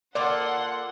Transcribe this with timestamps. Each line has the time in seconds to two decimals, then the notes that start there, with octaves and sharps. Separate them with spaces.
0.15 A#3 F4 A4 D5 F#5 C6